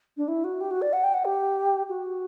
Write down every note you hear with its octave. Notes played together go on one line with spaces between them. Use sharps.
D4
E4
F#4
G4
F#4
D5
F#5
G5
F#5
G4
F#4